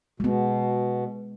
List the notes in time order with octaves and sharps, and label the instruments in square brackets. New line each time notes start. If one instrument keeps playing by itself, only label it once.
[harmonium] B2 [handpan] G#3 B3